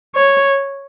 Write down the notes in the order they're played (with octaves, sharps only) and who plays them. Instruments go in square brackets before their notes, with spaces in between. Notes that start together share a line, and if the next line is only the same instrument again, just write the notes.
[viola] C#5